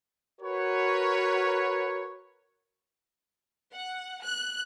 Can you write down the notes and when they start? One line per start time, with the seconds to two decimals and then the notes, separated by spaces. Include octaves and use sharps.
0.42 F#4 A#4 B4 C#5
3.74 F#5
4.23 F#6